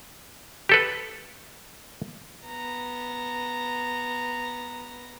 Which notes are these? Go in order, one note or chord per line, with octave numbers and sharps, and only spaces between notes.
G4 A4 B4
B3 A#5